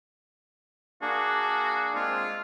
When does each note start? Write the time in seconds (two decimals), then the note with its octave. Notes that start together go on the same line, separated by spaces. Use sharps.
1.02 A#3 D4 F#4 G#4
1.95 G#3 C4 F4 G#4